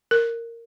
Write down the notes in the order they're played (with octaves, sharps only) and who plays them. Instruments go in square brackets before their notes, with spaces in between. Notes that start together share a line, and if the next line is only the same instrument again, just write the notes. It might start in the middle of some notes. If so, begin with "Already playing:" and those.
[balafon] A#4